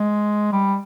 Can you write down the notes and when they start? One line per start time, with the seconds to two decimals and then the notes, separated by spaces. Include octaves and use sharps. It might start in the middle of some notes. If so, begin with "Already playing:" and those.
Already playing: G#3
0.52 G3